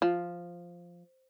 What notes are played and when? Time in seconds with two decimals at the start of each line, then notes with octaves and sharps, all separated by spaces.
0.02 F3